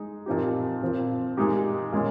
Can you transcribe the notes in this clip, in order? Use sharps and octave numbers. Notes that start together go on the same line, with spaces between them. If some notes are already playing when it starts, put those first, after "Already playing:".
Already playing: G#3 D#4 G#4
A#2 F3 C4 D#4 G4
A#2 F3 C4
A#2 G#3 D#4 G4
A#2 G#3 C#4